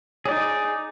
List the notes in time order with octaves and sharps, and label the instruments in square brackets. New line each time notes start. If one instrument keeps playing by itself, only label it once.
[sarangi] D#4 [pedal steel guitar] G#4 D5